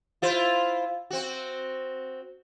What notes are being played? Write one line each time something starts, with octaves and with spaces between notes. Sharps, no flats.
E4 F4 C5
C4 F#4